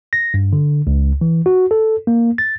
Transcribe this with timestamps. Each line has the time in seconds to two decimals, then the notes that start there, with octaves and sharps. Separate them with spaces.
0.13 A#6
0.34 G2
0.53 D3
0.87 C#2
1.21 E3
1.46 F#4
1.71 A4
2.07 A#3
2.38 A6